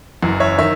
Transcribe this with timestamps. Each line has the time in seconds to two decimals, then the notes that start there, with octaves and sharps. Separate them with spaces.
0.22 F#1 F#2 E3
0.40 C#5 E5
0.58 D#3 C#5 E5